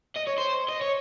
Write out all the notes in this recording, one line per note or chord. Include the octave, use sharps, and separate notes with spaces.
D#5
C#5
C5
D#5
C#5